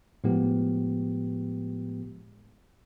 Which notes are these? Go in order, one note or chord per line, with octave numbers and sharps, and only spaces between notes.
A2 F3 G#3 B3 G4